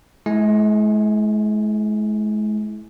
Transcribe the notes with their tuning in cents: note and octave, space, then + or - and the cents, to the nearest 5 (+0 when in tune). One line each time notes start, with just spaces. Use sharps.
G#3 +40 E4 -10 G#5 +0